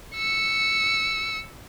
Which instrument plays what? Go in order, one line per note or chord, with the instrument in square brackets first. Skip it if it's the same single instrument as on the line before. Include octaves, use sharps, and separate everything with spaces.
[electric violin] E6 C#7